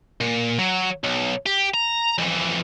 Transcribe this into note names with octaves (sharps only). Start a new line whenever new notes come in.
A#2
F#3
B1
G4
A#5
F2 E3